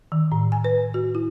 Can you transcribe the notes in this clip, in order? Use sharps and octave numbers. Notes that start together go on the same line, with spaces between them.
D#3
A2
G#5
B4
F#4
E4